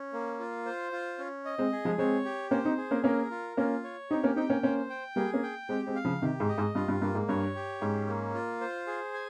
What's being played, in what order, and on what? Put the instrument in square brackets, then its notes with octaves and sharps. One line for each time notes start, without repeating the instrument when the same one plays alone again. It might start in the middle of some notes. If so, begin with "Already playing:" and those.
Already playing: [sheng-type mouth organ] C#4
A#3
F4
C5
F4
C#4
D#5
[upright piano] G#3 C4
[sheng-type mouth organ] G#4
[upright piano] F3 G#3
[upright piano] G#3 C4 [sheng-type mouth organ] C#5
[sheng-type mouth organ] G4
[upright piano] A#3 C#4 [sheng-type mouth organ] C5
[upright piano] C4 D#4
[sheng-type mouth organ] G#4
[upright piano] A#3 C#4
[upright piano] A#3 C#4 [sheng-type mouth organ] A#4
[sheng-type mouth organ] F4
[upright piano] A#3 C#4 [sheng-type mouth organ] F4
[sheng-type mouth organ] C#5
[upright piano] C4 D#4 [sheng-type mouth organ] G4
[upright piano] A#3 C#4
[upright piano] C4 D#4 [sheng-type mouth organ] G5
[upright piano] A#3 C#4
[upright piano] A#3 C#4 [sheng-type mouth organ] C5
[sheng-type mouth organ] G5
[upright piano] G3 A#3 [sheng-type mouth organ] G#4
[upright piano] A#3 C#4
[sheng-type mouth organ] G5
[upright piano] G#3 C4 [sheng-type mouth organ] G4
[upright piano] G#3 C4
[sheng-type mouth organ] F5
[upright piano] C#3 F3
[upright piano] C3 D#3 [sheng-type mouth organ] G4
[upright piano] G#2
[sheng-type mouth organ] D#5
[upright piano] G#2
[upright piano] G2 [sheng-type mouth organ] F4
[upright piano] G2
[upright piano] G2 [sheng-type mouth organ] A#3
[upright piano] G#2
[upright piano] G2 [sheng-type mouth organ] C#5
[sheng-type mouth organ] G4
[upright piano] G#2 [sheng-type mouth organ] C#4
[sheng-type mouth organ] A#3
F4
C5
G#4
G#5